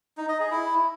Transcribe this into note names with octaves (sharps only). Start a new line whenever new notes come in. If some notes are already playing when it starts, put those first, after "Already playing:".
D#4
D#5
G#4
E4